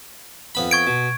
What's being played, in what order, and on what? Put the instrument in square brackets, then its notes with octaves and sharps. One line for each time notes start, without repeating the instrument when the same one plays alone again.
[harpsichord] F2 B3 B5
[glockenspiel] C#6 G#6 D7
[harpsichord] B2